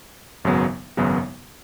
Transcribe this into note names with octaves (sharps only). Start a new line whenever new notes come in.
G#1 F#2 C#3 F#3 B3
G#1 F#2 C#3 F#3 B3